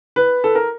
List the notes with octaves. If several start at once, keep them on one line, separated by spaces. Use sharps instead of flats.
B4
A4
A#4